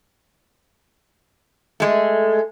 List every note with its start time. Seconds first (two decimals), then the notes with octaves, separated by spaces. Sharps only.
1.80 G#3 A3